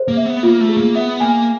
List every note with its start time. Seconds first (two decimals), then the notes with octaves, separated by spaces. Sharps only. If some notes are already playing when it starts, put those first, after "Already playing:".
Already playing: G#4 C5
0.08 A#3
0.17 E5
0.26 B3
0.43 A#3 F4
0.60 A3
0.69 G#4
0.77 A#3
0.95 B3 E5
1.20 A#3 G#5